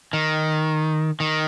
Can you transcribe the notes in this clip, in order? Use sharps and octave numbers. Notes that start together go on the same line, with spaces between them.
D#3
D#3